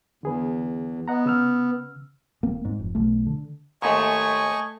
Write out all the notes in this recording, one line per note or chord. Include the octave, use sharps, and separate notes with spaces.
E2 D3 G#4 B4
B3 D#5 F#5 A#5
C#3 E6 F6
D#1 A#3 C4
G#2
F1
B1 A3
D3
D#2 G#2 A3 D#5 G#5 C#6